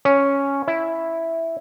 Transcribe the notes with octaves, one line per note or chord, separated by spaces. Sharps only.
C#4
E4